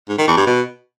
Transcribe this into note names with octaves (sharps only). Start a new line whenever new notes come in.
G#2
D#3
E2
G2
B2